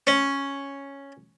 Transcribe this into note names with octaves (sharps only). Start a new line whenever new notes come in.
C#4